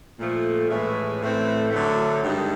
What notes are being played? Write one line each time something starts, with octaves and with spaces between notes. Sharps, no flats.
A#2 F3 A3
A2 E3 G#3 C#4 E4
A2 E3 A3 C4
F#2 D3 F#3 A3
G2 D#3 G#3